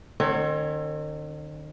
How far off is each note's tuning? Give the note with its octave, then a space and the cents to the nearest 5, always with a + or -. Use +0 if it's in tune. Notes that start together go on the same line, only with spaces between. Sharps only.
D#3 -45 C4 +35 C#5 +0